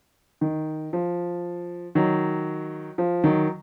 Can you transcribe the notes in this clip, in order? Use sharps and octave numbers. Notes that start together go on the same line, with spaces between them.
D#3
F3
D#3 F#3
F3
D#3 F#3